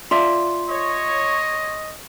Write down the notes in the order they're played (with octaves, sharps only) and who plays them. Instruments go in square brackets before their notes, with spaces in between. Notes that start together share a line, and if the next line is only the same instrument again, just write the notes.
[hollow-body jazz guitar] F4 D5 E5 [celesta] C6
[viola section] C#5 [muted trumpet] D#5